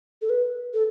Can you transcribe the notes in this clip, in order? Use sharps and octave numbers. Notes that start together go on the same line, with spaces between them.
A4
B4
A4